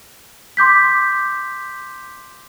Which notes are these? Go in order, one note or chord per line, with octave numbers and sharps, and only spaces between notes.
C6 D6 G6 B6